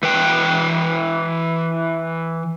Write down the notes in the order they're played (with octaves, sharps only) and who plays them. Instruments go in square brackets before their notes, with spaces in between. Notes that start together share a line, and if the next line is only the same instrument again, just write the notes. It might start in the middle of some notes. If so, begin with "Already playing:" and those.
[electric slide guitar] E3 B4 G5